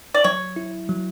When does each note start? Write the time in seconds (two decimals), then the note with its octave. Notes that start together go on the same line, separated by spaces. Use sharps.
0.14 D5
0.24 F#3 C#5
0.56 E4
0.89 F#3